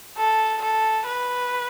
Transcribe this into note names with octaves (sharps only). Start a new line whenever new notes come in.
A4
A4
B4